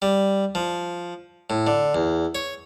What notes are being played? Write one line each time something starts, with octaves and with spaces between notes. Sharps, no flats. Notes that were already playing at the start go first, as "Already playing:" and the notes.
G3
F3
A2
D3
E2
C#5